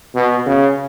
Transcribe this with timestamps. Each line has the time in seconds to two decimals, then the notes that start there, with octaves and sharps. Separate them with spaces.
0.15 B2
0.46 C#3